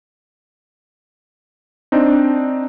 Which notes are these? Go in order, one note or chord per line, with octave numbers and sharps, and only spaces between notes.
C4 D4 D#4